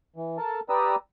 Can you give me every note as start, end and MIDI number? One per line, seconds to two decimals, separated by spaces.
0.16 0.37 52
0.38 0.60 69
0.38 0.60 70
0.38 0.60 81
0.69 0.95 67
0.69 0.95 71
0.69 0.95 74
0.69 0.95 82
0.69 0.95 87
0.69 0.95 88